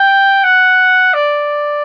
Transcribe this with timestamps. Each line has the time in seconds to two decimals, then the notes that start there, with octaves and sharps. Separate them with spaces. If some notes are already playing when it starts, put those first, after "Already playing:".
Already playing: G5
0.44 F#5
1.14 D5